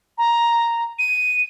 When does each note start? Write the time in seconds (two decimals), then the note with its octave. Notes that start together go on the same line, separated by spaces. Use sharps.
0.18 A#5
0.99 D#7